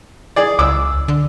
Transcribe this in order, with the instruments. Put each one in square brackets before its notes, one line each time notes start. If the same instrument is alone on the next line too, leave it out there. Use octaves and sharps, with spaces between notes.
[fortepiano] G#4 D5
[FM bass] C#2 [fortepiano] D6 E6
[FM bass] D3